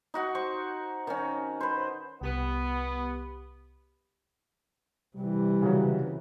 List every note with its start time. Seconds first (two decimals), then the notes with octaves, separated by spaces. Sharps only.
0.14 D#4 F#4 F#5 C#6
0.35 C5 C#6
1.07 D#3 C#4
1.61 B4 C5
2.21 C2 B3 G4 B5
5.16 C3 E3 G3
5.62 C#3 F#3